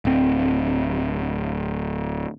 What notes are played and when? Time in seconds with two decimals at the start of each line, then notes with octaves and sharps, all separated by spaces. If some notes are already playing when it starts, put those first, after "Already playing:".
0.05 D1 C4